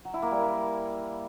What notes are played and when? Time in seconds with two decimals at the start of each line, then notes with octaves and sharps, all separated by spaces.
0.05 F#3
0.14 E4
0.22 A#3
0.31 G3